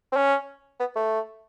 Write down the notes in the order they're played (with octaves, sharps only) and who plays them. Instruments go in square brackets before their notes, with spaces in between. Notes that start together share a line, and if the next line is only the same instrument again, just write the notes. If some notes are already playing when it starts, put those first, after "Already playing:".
[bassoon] C4
C#4
B3
A3